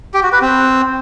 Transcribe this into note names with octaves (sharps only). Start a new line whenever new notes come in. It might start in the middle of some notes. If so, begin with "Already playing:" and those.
G4
F#4
B4
C4